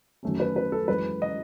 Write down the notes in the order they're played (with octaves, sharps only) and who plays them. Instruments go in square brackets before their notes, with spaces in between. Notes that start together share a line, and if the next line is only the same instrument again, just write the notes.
[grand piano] F#2 D#3 A3 C#4
B4
B4
A4
F#2 E3 G#3 B4
D#5